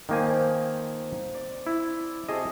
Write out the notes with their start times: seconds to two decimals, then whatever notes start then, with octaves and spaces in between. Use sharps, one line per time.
0.09 D#3 F3 A#3 C4 G#5
1.35 D5
1.67 E4
2.29 C3 F#4 G#4 A4 D#5